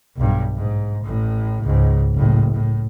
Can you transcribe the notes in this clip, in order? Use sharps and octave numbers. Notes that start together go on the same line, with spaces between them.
B1 G2
G#2
A1 A2
C#2 G#2
F#1 A2
A2